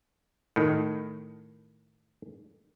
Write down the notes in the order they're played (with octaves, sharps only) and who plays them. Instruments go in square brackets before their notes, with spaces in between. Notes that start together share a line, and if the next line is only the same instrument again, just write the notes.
[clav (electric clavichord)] A2 D#3